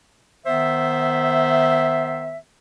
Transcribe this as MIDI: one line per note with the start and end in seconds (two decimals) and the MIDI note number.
0.46 2.38 51
0.46 2.38 59
0.46 2.38 72
0.46 2.38 76